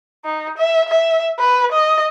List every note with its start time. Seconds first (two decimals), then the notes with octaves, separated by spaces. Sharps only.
0.25 D#4
0.58 E5
0.89 E5
1.39 B4
1.72 D#5